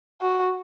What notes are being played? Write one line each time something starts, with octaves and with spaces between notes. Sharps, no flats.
F#4